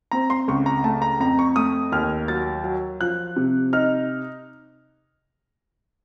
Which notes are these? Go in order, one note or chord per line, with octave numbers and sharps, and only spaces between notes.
C4 A#5
C6
C#2 C#6
A#5
A3 A5
A#5
F2 A#5
C#6
A3 D#6
D#2 F6
F#3 A6
F#3
F3 F#6
C3
D#4 F6